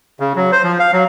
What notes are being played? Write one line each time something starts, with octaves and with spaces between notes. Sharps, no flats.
C#3
F#3
C5
F3
F5
F#3